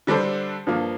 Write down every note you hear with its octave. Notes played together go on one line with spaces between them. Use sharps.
D3 G3 D4 A4 C5
G2 F3 A#3